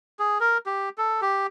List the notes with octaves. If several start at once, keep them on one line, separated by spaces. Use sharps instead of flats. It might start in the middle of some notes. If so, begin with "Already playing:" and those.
G#4
A#4
G4
A4
G4